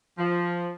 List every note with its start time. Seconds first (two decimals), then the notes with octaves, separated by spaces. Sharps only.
0.18 F3